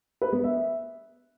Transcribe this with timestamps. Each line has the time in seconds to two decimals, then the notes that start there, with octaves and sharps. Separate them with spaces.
0.21 B4
0.33 B3
0.44 E5